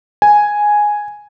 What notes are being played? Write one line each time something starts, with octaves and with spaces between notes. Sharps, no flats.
G#5